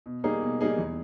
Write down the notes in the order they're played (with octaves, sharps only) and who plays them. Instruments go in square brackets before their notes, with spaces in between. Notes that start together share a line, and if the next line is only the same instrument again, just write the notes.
[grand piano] B2
G3 A#3 D#4 G#4
B2
G3 A#3 D#4 G#4
E2